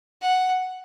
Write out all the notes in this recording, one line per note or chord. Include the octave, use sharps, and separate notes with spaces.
F#5